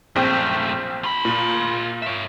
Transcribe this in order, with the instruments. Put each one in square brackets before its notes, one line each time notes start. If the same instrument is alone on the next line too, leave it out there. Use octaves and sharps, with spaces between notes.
[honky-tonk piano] A#1 C4 G5 [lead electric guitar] F#2 A3
[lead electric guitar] F4 B5
[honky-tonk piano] A#2
[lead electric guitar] C#5 E5